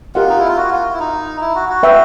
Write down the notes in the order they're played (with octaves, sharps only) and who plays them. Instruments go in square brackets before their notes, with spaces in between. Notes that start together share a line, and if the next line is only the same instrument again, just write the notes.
[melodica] F4 [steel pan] G4 A#4 D#5 F#5
[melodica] D#4
E4
F4
F#4
F4
E4
D#4
E4
F#4
F#4
[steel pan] B4 E5 G5